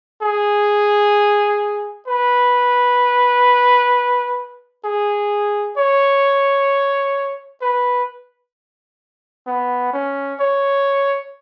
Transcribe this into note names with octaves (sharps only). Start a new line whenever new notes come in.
G#4
B4
G#4
C#5
B4
B3
C#4
C#5